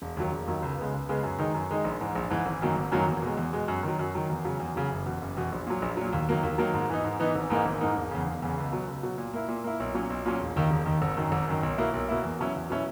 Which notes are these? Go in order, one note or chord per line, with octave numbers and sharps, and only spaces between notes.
E1
D#2 D#3 F#3
E1
D#2 D#3 F#3
C#2
C#3 G#3 B3
C#2
C#3 G#3 B3
F#2
D#3 G#3 D#4
F#2
D#3 G#3 D#4
A#1
G#2 E3
A#1
G#2 E3
G#1
F#2 D#3 F#3 A#3
G#1
F#2 D#3 F#3 A#3
E2
B2 G#3
E2
B2 G#3
F#2
D#3 F#3
F#2
D#3 F#3
E2
C#3 F#3
E2
C#3 F#3
F#1
E2 B2
F#1
E2 B2
A#1
A#2 F#3
A#1
A#2 F#3
D#2
D#3 F#3 A#3
D#2
D#3 F#3 A#3
G#2
E3 B3 D#4
G#2
E3 B3 D#4
G#1
G#2 E3 A#3 D#4
G#1
G#2 E3 A#3 D#4
E1
E2 C#3
E1
E2 C#3
C#2
B2 F#3
C#2
B2 F#3
A#2
A#3 E4
A#2
A#3 E4
B1
A#2 F#3 C#4
B1
A#2 F#3 C#4
E1
D#2 D#3
E1
D#2 D#3
G#1
F#2 D#3
G#1
F#2 D#3
B1
B2 A#3 E4
B1
B2 A#3 E4
E2
B2 F#3 C#4 E4
E2
B2 F#3 C#4 E4